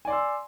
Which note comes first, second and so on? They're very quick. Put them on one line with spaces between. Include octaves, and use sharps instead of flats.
G#5 D5 C6 E6